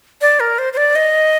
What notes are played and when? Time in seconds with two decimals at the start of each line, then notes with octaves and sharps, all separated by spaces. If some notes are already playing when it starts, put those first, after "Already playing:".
0.21 D5
0.40 A#4
0.59 C5
0.73 C5
0.77 D5
0.95 D#5